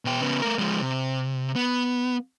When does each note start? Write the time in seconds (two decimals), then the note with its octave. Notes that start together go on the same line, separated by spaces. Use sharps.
0.05 B2 G5
0.21 C#3 B3
0.42 A3 A#4
0.59 F3 G#3
0.81 C3
1.56 B3